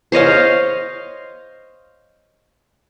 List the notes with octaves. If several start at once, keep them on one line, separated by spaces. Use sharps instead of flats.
C5 C#5 D#5 F5